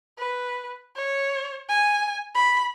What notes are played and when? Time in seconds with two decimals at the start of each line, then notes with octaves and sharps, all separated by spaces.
0.18 B4
0.96 C#5
1.69 G#5
2.35 B5